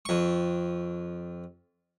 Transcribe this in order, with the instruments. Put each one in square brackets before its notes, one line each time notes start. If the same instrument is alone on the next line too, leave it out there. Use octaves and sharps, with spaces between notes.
[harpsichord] F2 C#6